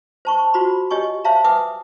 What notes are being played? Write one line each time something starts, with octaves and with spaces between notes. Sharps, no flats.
C5 A5 C#6
F4 F#4 C5 A#5 B5
G4 C#5 D#5 G#5 C#6
C5 C#5 E5 F5 A5 A#5
B4 E5 F#5 G#5 D6 D#6